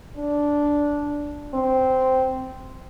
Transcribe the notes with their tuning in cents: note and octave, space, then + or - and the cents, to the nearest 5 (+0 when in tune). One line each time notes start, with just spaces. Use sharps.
D4 -10
C4 -10